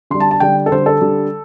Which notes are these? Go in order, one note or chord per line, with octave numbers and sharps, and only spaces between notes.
D3 G3 C6
A5
A5
D3 G3 G5
A4
D3 G3 C5
A4
D3 G3